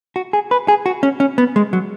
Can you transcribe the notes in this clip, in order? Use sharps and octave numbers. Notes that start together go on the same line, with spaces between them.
F#4
G#4
B4
G#4
F#4
C#4
C#4
B3
G#3
F#3